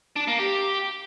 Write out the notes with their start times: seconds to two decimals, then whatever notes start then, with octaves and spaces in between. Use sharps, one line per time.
0.16 D4
0.28 A#3
0.39 G4